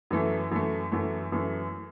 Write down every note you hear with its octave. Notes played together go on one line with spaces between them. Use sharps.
F#2 E3 A3
F#2 E3 A3
F#2 E3 A3
F#2 E3 A3